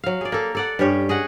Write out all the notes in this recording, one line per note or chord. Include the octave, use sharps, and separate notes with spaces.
F#3 F5
G#4 D5
A#3 A4
A4 D5 F#5
G2 C#4 G4 C#5
G#4 D#5 F#5